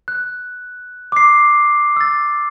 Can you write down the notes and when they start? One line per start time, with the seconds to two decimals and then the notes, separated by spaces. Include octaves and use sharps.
0.08 F#6
1.12 D6 C7
1.96 E6 A6